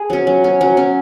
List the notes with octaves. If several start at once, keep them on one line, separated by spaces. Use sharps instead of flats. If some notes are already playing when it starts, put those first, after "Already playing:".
Already playing: G#4
F#3 C#4
F#3
C#4
F#3
C#4